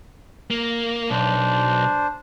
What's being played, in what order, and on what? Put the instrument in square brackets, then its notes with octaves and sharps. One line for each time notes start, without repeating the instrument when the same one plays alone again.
[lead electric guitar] A#3
[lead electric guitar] B1 [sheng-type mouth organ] D4 C5